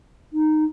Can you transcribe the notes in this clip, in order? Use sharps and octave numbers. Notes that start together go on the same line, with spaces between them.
D#4